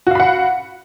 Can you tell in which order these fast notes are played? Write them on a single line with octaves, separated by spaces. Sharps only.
F#4 F5 B5 F#5